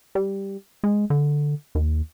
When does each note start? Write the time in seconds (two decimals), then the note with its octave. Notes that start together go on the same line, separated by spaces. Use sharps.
0.15 G3
0.84 G#3
1.10 D3
1.75 D#2